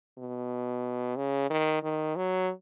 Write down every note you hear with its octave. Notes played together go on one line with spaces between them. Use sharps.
B2
C#3
D#3
D#3
F#3